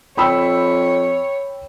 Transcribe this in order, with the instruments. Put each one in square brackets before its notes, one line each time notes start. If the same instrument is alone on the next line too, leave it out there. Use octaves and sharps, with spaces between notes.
[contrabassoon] F2 [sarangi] C#5 [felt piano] G5 B5 E6